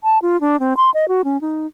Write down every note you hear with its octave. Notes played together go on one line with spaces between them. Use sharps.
A5
F4
D4
C4
C6
D#5
F#4
C#4
D#4